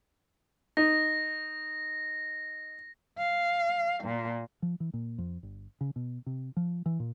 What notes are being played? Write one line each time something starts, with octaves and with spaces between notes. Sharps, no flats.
D#4 A#6
F5
A#2
F3
E3
A#2
F2
G1
C#3
B2
C3
F3
E3
A#2